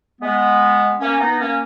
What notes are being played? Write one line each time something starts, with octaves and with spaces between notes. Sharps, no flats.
G#3 B3
A#3 C#4
B3 D#4
A#3 C#4